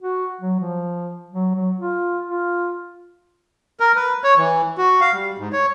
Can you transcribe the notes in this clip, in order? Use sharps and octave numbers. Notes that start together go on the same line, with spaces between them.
F#4
F#3
F3
F#3
F#3
F4
F4
A#4
B4
C#5
E3
F#4
F5
G3
G#2
C#5